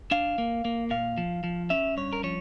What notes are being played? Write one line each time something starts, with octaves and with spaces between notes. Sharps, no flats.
D4 F5
A#3
A#3
A#2 F5
F3
F3
C#4 E5
G2 C#5
A#4
F3 C#5